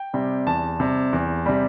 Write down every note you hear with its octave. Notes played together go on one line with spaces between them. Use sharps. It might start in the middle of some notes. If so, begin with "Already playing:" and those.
Already playing: G5
C3 G3
E2 A5
C3 G3
E2
C3 G3